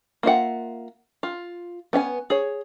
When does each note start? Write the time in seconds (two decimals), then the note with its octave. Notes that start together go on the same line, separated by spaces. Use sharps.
0.23 A#3 F4 E5 F#5
1.23 F4
1.93 B3 C#4 E5 G#5
2.30 G#4 C#5